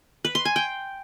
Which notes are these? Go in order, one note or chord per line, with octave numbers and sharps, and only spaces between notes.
B4
C6
G#5
G5